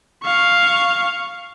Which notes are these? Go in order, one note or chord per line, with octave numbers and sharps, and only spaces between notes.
F5 C#6